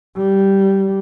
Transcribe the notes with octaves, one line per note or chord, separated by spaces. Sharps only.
G3